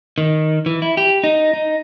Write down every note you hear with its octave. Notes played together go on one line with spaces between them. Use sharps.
D#3
E3
E4
G4
D#4
D#4